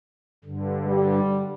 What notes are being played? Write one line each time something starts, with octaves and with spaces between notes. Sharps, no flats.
G2 D3
G3